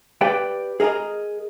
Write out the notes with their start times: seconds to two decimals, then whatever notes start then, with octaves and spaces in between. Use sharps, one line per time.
0.21 G4 B4 D5 G5
0.80 G#4 A#4 D#5 G#5 A#5